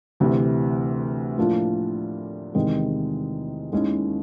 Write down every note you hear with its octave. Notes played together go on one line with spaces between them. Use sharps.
D2 C3 E3
A2 F3 A#3 D4 F4
E2 C3 D#3 G#3 C4
D#2 D#3 G#3 C#4 E4